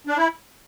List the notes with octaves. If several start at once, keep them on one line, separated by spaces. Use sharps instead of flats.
D4
E4